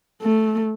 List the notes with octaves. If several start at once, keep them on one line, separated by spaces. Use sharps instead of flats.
A3